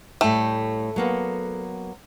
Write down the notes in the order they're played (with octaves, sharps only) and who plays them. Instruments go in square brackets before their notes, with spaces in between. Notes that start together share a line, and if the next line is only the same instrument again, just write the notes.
[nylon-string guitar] A2 G3 G5 [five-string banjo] A3
[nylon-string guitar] F#3 A#3 B3